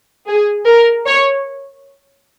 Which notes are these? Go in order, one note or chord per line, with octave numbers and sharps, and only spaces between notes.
G#4
A#4
C#5